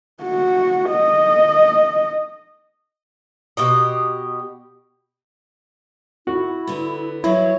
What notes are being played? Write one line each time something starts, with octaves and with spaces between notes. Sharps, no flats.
F#4
D#5
B2 G4 D#5
E4 F#4
D3 B3
D#3 E3 F#3 E4 C#5